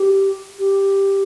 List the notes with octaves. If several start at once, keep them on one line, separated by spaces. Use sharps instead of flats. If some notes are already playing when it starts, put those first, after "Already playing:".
Already playing: G4
G4